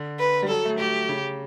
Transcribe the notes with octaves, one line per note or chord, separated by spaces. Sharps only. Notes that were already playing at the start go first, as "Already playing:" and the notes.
Already playing: D3
B4
G3
F#3 A4
A3
A3 G4
C#3